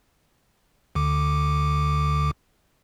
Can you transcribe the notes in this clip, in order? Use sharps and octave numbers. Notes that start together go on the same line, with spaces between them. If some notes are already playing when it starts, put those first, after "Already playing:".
D2 D3 D6